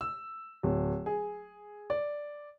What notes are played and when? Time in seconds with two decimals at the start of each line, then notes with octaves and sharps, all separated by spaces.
0.01 E6
0.63 D1
1.06 G#4
1.90 D5